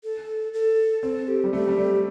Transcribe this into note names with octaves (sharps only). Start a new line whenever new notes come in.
A4
A4
C4 A4
G4
G3
A3 G4
G3
A3